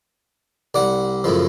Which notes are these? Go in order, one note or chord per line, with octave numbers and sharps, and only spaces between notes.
C2 D5 F#5
F#2 A2 C#3 F3